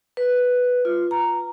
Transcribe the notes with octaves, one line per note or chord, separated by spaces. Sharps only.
B4
F4
A#5